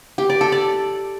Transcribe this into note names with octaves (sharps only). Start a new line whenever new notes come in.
G4
D5
A4
D5